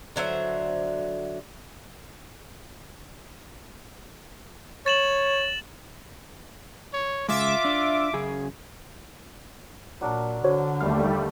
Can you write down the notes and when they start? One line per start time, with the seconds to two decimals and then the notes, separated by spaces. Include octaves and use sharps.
0.16 D3 F#3 C5 E5
4.86 C#5 A6 E7 F#7
6.93 C#5
7.29 C#3 G#3 F4 E5 D6
7.65 D4
8.13 F#2 C#3 G#4
10.01 A#2 F#3 D4 A#4
10.44 D3 F#4 C5 C#5
10.81 D#2 G3 A3 F5 F6